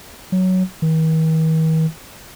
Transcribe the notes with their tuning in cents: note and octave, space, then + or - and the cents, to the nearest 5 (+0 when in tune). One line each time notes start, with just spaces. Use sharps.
F#3 +5
D#3 +45